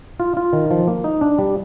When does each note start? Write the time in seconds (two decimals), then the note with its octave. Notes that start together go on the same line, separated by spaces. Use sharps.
0.20 F4
0.37 F4
0.53 D#3
0.71 F3
0.88 A#3
1.04 D#4
1.21 D4
1.38 G3